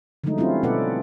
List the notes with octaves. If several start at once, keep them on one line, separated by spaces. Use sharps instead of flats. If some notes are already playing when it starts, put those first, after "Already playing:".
D3 F3 F#3 G#3 A3 D#4
G3 C4 C#4 E4 F4
B2 B3 A4 B4 D5 F#5